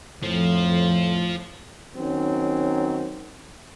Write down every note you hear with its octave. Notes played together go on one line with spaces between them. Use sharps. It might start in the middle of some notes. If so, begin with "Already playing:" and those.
F2 A2 F3
D#3 F#3 C4 C#4